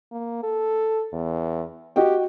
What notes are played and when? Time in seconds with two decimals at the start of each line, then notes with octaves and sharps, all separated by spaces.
0.12 A#3
0.43 A4
1.13 E2
1.96 F#4 G4 D#5 G5